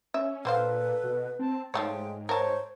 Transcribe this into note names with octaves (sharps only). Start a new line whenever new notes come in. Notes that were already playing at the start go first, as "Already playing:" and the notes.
C#4 E5
A#2 D3 A4 B4 C5 F5
B2
C4 A5
G#2 F3 G#3 A3 C#5 G5
A#4 C5 C#5 A5